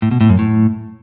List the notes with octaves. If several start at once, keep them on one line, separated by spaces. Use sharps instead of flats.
A2
B2
A2
F#2
A2